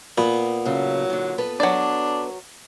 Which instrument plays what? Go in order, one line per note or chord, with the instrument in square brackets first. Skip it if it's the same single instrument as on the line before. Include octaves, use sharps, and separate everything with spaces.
[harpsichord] A#2 [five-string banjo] B3
[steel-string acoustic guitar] A2 C#3 [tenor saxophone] F#3
[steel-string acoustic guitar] G#2 D3
B3 A4 B4
[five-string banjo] F#3 D5 [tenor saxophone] D4